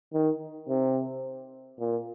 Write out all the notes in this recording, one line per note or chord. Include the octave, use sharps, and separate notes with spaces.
D#3
C3
A#2